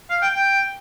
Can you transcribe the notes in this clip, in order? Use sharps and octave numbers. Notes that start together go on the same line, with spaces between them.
F5
G5
G5